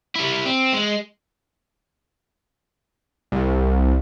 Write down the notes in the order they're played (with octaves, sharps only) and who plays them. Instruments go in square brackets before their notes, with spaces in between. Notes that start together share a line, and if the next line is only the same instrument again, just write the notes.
[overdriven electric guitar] G3 E4
C4
G#3
[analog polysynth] C2